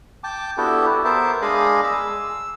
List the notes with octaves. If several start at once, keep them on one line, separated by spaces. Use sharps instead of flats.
G5 A5 D6
B3 D4 E4 F#4 G4 A4
B3 A#4 C5 E5 A5
G#3 D4 G#4 D#5 F5 B5
E6